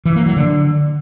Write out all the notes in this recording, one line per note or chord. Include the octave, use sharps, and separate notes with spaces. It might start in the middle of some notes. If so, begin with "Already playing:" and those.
E3
A#3
F#3
D3